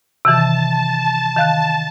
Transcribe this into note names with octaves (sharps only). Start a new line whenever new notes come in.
C3 D#3 E3 A5
D#3 F5 F#6